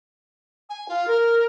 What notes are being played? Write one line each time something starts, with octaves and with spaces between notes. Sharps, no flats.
G#5
F4
A#4